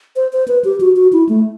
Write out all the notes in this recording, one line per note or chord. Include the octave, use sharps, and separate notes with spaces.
C5
C5
B4
G4
F#4
F#4
E4
A3